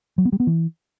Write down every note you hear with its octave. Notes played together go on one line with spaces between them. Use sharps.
F#3
B3
G3
B3
E3